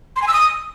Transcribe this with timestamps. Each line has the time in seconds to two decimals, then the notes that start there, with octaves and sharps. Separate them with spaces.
0.16 C6
0.22 G#5
0.28 E6
0.33 D#6